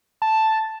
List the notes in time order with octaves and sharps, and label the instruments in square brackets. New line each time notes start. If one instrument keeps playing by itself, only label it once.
[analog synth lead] A5